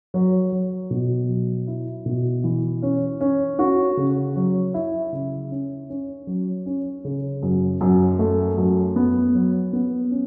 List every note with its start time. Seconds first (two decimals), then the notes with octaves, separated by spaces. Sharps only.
0.14 F#3
0.52 F#3
0.91 B2
1.29 F#3
1.67 E4
2.06 B2
2.44 E3
2.82 C#4
3.21 C#4
3.59 F#4
3.97 C#3
4.36 F#3
4.74 E4
5.12 C#3
5.51 C#4
5.90 C#4
6.27 F#3
6.66 C#4
7.04 C#3
7.43 F#2
7.81 F#2
8.19 A3
8.57 F#2
8.96 B3
9.35 F#3
9.73 B3
10.11 C#4